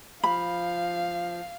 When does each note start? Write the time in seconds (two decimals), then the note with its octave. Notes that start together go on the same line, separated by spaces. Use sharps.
0.24 F3 F5 B5